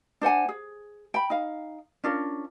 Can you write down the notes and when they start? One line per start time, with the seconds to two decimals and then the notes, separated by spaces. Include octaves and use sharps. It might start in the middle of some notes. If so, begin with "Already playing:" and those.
0.21 D4 C5 F#5 G#5
0.49 G#4
1.14 G5 B5
1.30 D#4 F5
2.04 C#4 D4 F4 A#4